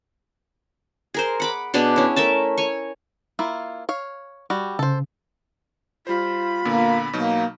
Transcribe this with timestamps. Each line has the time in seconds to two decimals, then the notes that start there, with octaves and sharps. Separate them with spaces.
1.14 G#4 A#4 C5
1.40 F#5 B5 D6
1.74 B2 B3 D4 G#4
1.96 C#4 E4
2.16 A3 A#4 E5 A5
2.58 C#5 G#5 C#6
3.39 A#3 E4 F4
3.89 C#5 F5
4.50 G3 F#4
4.79 C#3 A4 C5
6.07 G3 F4 C5 B5
6.65 A#2 D3 A#3 B3
7.13 B2 F#3 A#3 D#4